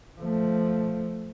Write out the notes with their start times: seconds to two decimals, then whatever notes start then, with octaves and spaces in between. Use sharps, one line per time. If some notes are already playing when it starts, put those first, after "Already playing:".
0.20 F3 A3